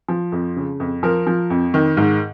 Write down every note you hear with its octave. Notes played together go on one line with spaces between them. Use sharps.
F3
F2
C#3
F2
F3 A#4
F3
F2
D#3
G#2